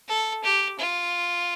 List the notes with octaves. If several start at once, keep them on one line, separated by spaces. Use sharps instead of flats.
A4
G4
F4